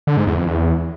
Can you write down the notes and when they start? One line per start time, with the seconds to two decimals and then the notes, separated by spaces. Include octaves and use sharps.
0.07 D3
0.17 G#2
0.27 E2
0.37 F2
0.47 E2